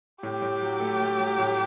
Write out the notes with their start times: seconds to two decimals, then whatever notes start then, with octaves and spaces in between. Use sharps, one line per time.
0.23 A2 G4
0.42 A2
0.62 F#3
0.80 A3
1.00 A3
1.19 F#3
1.39 A2